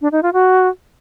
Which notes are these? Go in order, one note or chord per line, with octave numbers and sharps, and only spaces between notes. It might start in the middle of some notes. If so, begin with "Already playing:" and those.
D4
D#4
F4
F#4